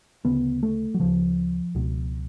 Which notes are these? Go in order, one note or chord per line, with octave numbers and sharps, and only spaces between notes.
D2 C#3 B3
A3
F#3
D2 C#3 F3
C#2 B2